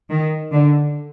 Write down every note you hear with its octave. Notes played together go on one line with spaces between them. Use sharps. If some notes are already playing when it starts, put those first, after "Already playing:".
D#3
D3